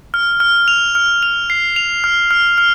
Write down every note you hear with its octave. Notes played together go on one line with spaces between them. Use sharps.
F6
F6
F7
F6
F7
C7
F7
F6
F6
F6